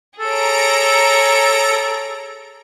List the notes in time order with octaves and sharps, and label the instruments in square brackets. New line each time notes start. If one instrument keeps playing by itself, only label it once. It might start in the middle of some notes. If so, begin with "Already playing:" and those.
[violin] G#4 C#5 [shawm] A4 [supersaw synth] A#5 D7